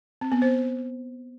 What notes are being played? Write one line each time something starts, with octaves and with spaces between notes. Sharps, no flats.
C4
B3
C5